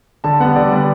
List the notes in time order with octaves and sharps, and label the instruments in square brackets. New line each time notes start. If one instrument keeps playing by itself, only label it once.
[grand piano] D3 A5
G3 B3 F#5
D3 D5
G3 B3